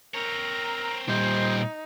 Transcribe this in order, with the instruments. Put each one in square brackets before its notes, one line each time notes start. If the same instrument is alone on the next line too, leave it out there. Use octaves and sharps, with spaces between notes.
[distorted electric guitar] C4 C#5 [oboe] A#4 [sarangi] A#5
[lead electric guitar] A#2 G3 [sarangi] D#4 [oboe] C5